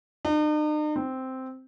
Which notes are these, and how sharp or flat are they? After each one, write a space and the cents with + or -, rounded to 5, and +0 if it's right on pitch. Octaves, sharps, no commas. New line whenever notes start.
D#4 -45
C4 -5